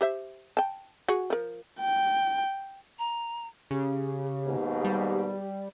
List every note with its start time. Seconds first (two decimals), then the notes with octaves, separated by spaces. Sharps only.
0.01 G4 C5 E5
0.57 G5 A5
1.08 F#4 G#4 F#5
1.30 F3 A#4
1.80 G5
2.99 A#5
3.71 C#3 G4
4.46 D#2 G#2 B2
4.85 G3